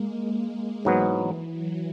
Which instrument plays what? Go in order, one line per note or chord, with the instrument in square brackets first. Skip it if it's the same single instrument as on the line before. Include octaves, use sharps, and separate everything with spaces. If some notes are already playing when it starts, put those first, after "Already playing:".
Already playing: [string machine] G#3 A#3
[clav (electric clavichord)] G#2 F#3 B3 [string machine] E3
[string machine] E3
F#3